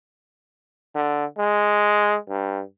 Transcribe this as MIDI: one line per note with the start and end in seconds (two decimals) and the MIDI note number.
0.95 1.25 50
1.38 2.17 56
2.29 2.62 43